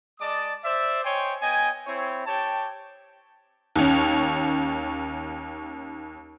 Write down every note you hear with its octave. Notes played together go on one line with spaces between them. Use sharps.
G#3 D5 D#5 A5 D6 D#6
C5 D5 E5
C5 C#5 D#5 G5 G#5 C6
B3 D#5 G5 G#5
C4 E4 C#5
G4 C#5 G5 A5
D#2 C#4